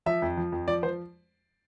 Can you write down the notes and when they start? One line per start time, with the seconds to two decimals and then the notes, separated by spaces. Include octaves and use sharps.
0.06 F3 E5
0.22 F2
0.37 F3
0.52 F2
0.68 F3 D5
0.83 F3 C5